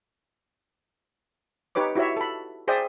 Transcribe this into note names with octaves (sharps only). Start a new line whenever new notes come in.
D#4 G4 B4 C#5 D6
E4 F#4 G4 C#5 E5
A4 B5
G#4 C5 D5 E5 G5 D#6